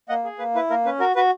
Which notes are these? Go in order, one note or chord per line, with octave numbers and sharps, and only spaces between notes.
A#3 D#5 F#5
G#4
A#3 B4
E4 B4
A#3 A#4
C#4 B4
F#4 A#4
F#4 B4